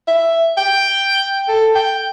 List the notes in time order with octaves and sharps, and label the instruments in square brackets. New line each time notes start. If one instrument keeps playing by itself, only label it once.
[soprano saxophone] E5
G5
A4
G5